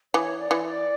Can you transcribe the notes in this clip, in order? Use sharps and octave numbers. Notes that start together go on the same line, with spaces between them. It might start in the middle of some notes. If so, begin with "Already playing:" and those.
E3 C#5
D5
E3
D5